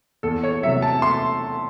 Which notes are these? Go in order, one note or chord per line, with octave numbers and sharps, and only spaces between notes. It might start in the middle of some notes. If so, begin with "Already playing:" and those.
E2 A4
C#5
C3 F#3 A3 E5
A5
C6